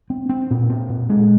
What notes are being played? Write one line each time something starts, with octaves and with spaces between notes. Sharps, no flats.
C4
C4
A#2
C4
A#2
G#3